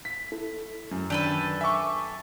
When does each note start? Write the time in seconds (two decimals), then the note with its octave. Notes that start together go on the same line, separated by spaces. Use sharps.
0.05 B6
0.32 E4 A4
0.91 F#2
1.10 D#3 D4 G4 A4 B4
1.61 E5 G#5 C#6 D6